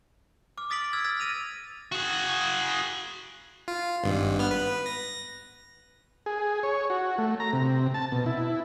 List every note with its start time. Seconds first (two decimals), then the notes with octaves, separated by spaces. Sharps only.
0.58 D6 F6
0.70 D#6 A6 B6 D7 F#7
0.93 E6 F6 G#6 A6
1.04 E6 F6 A6 B6
1.20 A6 A#6 D#7 F7
1.92 F#4 G#4
3.68 F4
4.04 G#1 G2
4.39 B3 F6
4.51 B4
4.86 A#6
6.26 G#4
6.63 C#5
6.90 F#4
7.18 A3
7.40 A#5
7.53 C3
7.94 A5
8.12 B2
8.26 E4